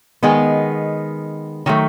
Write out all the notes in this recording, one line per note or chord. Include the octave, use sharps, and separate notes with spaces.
D#3 G#3 B3
D#3 F#3 A3